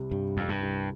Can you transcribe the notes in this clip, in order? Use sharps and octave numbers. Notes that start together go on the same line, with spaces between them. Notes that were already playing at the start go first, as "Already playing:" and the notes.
Already playing: C2 C3 G3
G2 G3
F2 G3
G2
C2